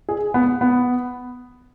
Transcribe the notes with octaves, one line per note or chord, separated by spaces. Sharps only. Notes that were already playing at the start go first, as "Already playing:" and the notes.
G#4
B3
B3